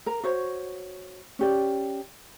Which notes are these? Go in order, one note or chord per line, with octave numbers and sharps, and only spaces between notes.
A#4 A#5
F#4 C5 C#5
C#4 G4 D5